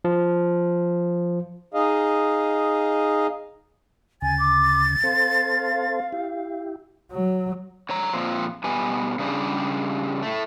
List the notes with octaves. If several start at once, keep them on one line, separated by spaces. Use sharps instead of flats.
F3
D#4 G#4 D#5 F5
D2 C#3 G#5 A6
D6
C4 A4 C5 F5
E4 G4
F#3
D3 C#5 A#5
A#2 F3 A#3 C4
B2 G3 B3 G#5
C#3 F#3 G3 D4 G4 G#4
A2 A3